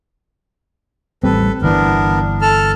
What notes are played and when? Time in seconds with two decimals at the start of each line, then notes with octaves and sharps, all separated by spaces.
1.24 A1 G3 C4 A4 B4
1.62 G1 E3 B3 D4 A#4
2.42 A4 A5 F6